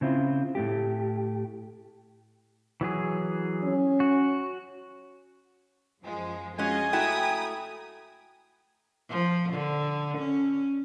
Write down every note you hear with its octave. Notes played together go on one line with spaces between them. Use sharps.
C#3 C4 E4 F4
A2 A3 G4
E3 F#3 G#4
C#4
F#4
F#2 F3 G#3
G#3 C#4 F4 F#4 G#4 D#5 G#5
A3 E4 F#4 G5 A#5 B5 D#6
F3
D3
C#4